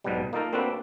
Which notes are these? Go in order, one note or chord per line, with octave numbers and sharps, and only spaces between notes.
B1 G#2 B2 F#3 G3
A#3 D#4 F4 A4 A#4
A#3 C4 D4 F#4 A4 B4